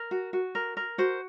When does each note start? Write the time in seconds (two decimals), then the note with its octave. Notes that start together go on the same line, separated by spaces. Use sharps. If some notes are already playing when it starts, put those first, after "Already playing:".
Already playing: A#4
0.11 F#4
0.33 F#4
0.55 A#4
0.77 A#4
0.98 F#4 C5